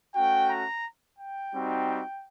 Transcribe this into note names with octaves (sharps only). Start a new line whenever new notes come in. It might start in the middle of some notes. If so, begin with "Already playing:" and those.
A3 C#4 F#4 G5
A#5
G5
G3 C4 D#4 F#4